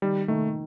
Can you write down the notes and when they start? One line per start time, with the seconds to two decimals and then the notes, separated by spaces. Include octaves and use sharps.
0.02 D#3 G3
0.28 D#3 A3